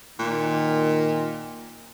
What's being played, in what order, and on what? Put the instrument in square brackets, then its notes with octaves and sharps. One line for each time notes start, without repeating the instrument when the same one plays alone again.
[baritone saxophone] A#2 [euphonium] D#3